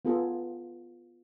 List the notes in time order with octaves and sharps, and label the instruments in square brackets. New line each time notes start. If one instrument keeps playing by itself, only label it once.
[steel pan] B3 F4 G#4 A4